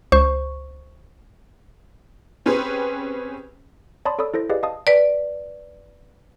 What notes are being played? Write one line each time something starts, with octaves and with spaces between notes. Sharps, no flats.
C#2 C5 C#6
C4 C#4 G4 G#4 B4 C5
C#5 D5 A5 B5 C6 D#6
A4 C#5 D5 B5 D#6 E6
E4 A4 C5 A#6
G4 G#4 B4 D5 D#5 F5
D#5 F5 A5 D#6
B4 D5